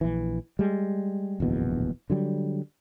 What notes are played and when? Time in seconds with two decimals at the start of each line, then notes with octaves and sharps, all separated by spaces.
0.01 A#1 E3
0.59 G3 G#3
1.40 D1 A#1 E2 B2
2.10 D3 F#3 G3